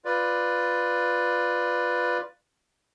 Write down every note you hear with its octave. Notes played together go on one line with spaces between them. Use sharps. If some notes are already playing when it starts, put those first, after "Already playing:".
F4 B4 D5